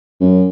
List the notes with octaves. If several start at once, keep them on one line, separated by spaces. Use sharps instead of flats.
F#2